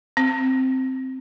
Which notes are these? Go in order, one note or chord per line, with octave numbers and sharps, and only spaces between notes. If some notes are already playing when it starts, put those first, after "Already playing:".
C4